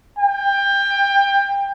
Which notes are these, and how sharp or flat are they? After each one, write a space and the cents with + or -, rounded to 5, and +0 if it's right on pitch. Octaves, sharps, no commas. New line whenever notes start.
G5 +25